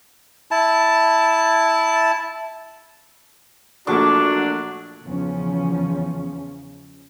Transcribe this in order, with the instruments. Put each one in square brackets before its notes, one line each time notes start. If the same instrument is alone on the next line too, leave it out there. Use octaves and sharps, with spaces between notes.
[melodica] E4 A5
[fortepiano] A#1 F3 A3 [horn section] F#3 A#3 D4 [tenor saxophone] F#4 [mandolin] D6
[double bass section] E2 C#3 F3 C#4